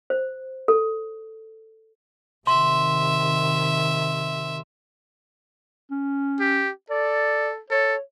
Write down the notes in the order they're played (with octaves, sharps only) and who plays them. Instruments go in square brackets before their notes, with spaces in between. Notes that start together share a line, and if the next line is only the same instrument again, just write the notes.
[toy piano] C5
A4
[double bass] C3 D#3 [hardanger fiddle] E5 [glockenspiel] C6
[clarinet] C#4
[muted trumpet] G4
[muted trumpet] A4 [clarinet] D5
[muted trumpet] A4 [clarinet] C#5